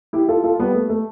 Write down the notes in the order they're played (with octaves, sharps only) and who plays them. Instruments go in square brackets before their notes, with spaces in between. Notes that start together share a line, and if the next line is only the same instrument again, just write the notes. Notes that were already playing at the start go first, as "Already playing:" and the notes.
[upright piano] E4 G4
F4 A4
F4 A4
G3 B3
A3
A3